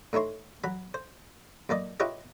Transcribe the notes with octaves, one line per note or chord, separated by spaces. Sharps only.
A2 D#4 E4 C#5 C6
F#3 B5
C5
F#2 A#3 D5 D#5
E4 F4 G4 B4 C#5 D#5